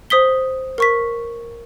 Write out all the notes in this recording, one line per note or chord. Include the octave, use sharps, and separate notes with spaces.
C5 D#6 B6 G7
A#4 C#6 B6